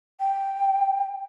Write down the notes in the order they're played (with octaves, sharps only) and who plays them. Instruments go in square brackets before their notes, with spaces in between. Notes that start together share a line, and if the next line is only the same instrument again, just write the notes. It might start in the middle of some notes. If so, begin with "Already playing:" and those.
[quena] G5